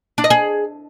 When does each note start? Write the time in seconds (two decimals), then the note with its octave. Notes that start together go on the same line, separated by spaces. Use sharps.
0.18 D4
0.24 D#5
0.30 G#4